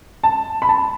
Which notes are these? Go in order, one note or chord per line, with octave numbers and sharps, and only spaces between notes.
A5
B5
A5